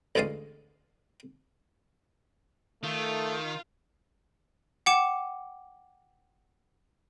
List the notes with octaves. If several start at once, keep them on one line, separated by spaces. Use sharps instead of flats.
A1 D2 G#3 D5 F5 D#6
D#3 A3 F4
F#5 G5 D6 C#7 E7